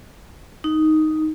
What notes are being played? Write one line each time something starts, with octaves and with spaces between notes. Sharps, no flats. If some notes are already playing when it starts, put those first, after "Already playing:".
D#4